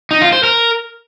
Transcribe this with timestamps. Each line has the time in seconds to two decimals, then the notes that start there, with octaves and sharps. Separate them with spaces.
0.11 D#4
0.22 F4
0.33 C5
0.43 A#4